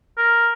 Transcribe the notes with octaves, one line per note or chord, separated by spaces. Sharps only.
A#4